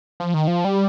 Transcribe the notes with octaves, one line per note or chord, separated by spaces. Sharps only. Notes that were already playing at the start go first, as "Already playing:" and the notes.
F3
D#3
F3
G3